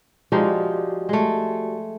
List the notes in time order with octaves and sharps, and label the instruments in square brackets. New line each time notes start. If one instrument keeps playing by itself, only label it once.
[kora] F3 G#3 D#4 [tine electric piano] F#4 G4 D5
[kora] G#3 A3